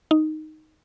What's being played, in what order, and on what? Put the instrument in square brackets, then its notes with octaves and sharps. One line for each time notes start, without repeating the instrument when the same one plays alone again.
[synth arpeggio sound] D#4